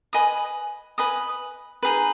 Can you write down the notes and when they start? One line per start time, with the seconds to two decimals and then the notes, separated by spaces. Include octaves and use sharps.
0.13 B4 D#5 G#5 D#6
0.98 B4 D#5 G#5 D#6
1.83 D#4 G#4 B4